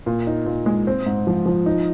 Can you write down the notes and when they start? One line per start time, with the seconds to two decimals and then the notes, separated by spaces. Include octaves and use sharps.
0.06 A#2
0.27 D#4
0.46 A#2
0.66 G#3
0.87 C4
1.06 G#2
1.27 F3
1.46 F3
1.66 D#4